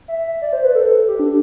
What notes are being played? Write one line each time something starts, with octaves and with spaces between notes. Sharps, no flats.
E5
D5
C5
B4
A4
G4
D4